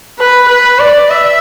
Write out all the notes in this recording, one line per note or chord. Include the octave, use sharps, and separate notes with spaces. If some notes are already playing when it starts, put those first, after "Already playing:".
B4
B4
D5
E5